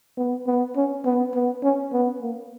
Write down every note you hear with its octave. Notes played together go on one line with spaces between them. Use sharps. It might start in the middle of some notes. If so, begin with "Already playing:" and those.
B3
B3
C#4
B3
B3
C#4
B3
A#3